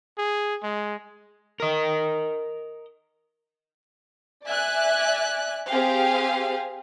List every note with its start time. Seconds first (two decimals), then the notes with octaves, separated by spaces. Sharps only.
0.18 G#4
0.63 G#3
1.60 A#4 D#5
4.46 D5 E5 G#5 F#6
5.71 C4 G4 G#4 F5